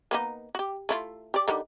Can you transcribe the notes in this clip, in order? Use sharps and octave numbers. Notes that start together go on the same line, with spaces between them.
A#3 B3 D#4
F#4 G4
A3 E4 F4
G4 D5
D3 D#3 G3